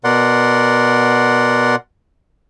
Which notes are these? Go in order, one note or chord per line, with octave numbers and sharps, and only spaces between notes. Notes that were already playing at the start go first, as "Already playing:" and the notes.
B2 A#4 D5 F#5 C6